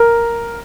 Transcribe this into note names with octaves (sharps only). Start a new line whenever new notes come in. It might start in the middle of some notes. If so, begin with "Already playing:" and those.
Already playing: A#4